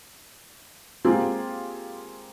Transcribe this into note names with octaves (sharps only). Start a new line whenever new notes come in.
G#3 A#3 C4 F4 G4 G#4